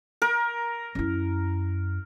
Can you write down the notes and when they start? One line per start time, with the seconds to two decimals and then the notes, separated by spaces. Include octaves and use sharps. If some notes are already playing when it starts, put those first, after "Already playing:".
0.22 A#4
0.95 F#2 E4